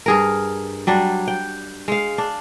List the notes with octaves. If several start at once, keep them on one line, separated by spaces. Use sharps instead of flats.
G2 G#4 A#4
F#3 G3 D4
G5
G#3 F5
D4